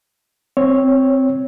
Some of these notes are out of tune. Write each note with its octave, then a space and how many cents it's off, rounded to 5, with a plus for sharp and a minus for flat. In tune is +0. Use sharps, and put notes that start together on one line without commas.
C4 +0 C#5 +0